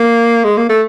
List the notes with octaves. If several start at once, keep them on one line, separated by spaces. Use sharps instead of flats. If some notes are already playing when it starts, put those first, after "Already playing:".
Already playing: A#3
G#3
A#3
A3